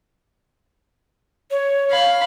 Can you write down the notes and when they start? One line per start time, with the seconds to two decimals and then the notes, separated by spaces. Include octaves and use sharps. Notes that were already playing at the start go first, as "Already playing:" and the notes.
1.51 C#5
1.90 F5 B5